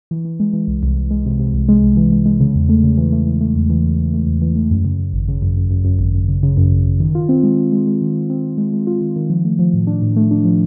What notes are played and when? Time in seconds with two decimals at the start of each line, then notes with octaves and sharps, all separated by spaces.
0.11 E3
0.25 E3
0.40 G#3
0.53 E3
0.67 C2
0.83 C2
0.97 C2
1.11 G#3
1.26 C3
1.39 C3
1.54 C2
1.69 G#3
1.82 C2
1.97 E3
2.12 G#3
2.26 G#3
2.40 C#3
2.55 E2
2.69 A3
2.83 C#3
2.98 E3
3.12 A3
3.26 E3
3.41 A3
3.56 E2
3.70 E3
3.84 E2
3.99 E2
4.13 A3
4.27 E2
4.42 E3
4.55 A3
4.71 F#2
4.85 C#3
4.99 F#2
5.13 G#1
5.28 C#3
5.42 F#2
5.57 F#2
5.71 F#2
5.85 F#2
5.99 G#1
6.14 F#2
6.28 C#3
6.43 C#3
6.57 F#2
6.72 G#1
6.86 G#1
7.00 D#3
7.15 F4
7.29 C4
7.43 G#3
7.57 G#3
7.72 G#3
7.87 G#3
8.01 D#3
8.16 G#3
8.30 C4
8.44 C4
8.58 G#3
8.73 G#3
8.87 F4
9.01 D#3
9.16 D#3
9.30 F3
9.45 A3
9.59 F3
9.74 A2
9.87 D4
10.02 A2
10.16 A3
10.31 D4
10.45 F3